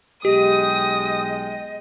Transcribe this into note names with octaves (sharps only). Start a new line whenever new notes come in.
B1 G#3 G4 D#5 G5 D#6